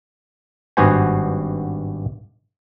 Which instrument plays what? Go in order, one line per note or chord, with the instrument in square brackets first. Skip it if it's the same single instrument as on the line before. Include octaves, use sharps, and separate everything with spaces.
[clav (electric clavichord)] G#1 G2 B3 F#4 C5 G#5